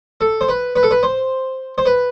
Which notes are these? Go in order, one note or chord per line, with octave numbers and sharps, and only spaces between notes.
A4
C5
B4
B4
A4
B4
C5
C5
B4